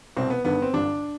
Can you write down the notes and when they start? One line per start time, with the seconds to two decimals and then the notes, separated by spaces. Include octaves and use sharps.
0.17 C2 B2 C4
0.30 B3
0.45 G#1 G2 D3 B3
0.62 C4
0.74 G1 G2 D3 D4